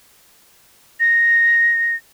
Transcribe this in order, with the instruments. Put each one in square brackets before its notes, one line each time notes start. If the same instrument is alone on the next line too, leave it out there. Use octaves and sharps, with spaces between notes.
[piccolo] A#6